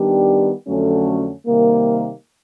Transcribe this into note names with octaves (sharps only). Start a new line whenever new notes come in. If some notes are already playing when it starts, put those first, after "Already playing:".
Already playing: D#3 G3 B3 D4 G4
F2 D3 F#3 A3 C#4
C3 D#3 G3 A#3